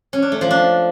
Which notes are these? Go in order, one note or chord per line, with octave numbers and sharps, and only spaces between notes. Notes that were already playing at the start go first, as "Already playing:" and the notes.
C#4
D4
A3
F3
D4